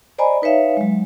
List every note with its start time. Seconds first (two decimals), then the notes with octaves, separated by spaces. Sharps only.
0.18 C5 D5 D#5 G#5 A#5 B5
0.42 D#4 B4 C#5 E5 F5
0.77 F#3 G#3